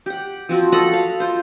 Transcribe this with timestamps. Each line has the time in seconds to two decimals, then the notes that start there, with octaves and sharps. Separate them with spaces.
0.06 G4 F#5
0.49 F3 C4 F#4
0.72 A4 D#5 F#5 B5
0.93 F5
1.20 F4 C5